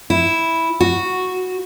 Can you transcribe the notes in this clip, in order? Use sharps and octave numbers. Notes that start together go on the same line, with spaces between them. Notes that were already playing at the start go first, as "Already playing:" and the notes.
E4
F#4